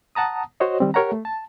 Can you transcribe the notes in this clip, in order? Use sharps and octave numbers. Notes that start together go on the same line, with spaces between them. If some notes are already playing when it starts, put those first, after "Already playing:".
F#5 A5 A#5 D#6
F#4 C5 C#5 D#5
D#3 G3 C4
G4 A#4 C#5 F#5 A#5
A3
A5